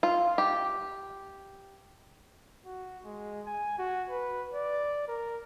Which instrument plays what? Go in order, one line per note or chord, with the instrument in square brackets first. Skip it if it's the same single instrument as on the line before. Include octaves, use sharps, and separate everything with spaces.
[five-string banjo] F4
G4
[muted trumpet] F#4
G#3
G#5
F#4
B4
D5
A#4